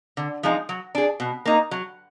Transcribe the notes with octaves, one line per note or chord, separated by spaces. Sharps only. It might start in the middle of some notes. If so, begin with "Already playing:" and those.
D3
F3 G#3 D#4
F#3
D4 G#4
B2
A#3 D#4
F#3